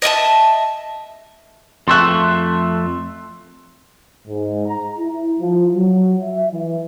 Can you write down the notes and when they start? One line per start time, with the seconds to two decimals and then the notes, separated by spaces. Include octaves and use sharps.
0.02 D#5 E5 G#5 A5
1.88 F2 A3 E5 C6 C#6 F#6
4.28 G#2
4.67 A#5
4.99 E4
5.40 F3
5.75 F#3
6.23 E5
6.51 E3